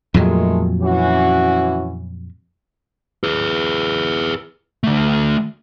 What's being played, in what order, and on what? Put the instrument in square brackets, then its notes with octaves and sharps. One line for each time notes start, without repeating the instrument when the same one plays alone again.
[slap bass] F2 A#2 F#3 [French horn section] D#3 G#3 A3
[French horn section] E3 C#4 F#4
[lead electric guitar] G#4 B4
D3 A3